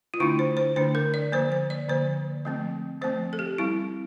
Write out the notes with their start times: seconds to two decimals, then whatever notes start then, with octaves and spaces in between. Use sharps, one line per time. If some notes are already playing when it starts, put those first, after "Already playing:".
0.14 F4
0.20 D3 A3 D4 E4
0.39 C5
0.57 C5
0.76 D3 A3 D4 C5
0.95 A#4
1.14 D5
1.32 D3 F3 A#3 C5
1.52 C5
1.70 D5
1.89 D3 F3 A#3 C5
2.45 F3 A3 C4
3.01 F3 A3 C4 C5
3.33 A4
3.39 G4
3.58 G3 C4 E4